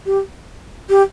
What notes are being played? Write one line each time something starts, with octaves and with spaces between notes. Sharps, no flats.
G4
G4